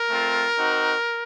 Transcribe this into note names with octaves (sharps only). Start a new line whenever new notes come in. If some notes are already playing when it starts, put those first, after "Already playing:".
Already playing: A#4
A3 C4 F4
C4 D#4 F#4